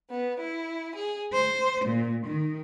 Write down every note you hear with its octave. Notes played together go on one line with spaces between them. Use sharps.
B3
E4
G#4
C5
A#2
D#3